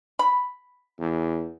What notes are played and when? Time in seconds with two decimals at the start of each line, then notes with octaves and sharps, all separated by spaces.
0.19 B5
1.00 E2